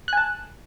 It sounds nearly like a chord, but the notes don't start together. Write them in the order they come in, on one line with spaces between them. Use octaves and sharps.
F#6 G#5 A5